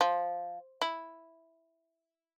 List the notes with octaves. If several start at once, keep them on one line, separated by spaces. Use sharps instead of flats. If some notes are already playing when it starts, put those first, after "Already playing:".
F3
E4